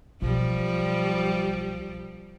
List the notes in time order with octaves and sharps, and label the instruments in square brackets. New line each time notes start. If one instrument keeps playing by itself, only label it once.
[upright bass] B1 [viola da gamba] F3 G3